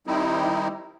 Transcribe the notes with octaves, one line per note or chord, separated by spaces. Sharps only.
D#3 G3 C4 D#4 E4